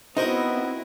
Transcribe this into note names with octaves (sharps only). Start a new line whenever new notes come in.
B3 C4 D#4 E4 F#4 A#4 C5 D#5